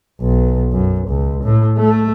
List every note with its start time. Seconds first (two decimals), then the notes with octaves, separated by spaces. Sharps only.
0.21 B1
0.73 F#2
1.09 C#2
1.44 A2
1.78 A3